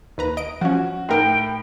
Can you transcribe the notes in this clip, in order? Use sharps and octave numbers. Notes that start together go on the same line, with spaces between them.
D#2 B4 A#5
D#5 D7
F3 C#4 F#4
A2 D#4 A#4 G5